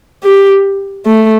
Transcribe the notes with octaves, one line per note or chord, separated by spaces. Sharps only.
G4
A3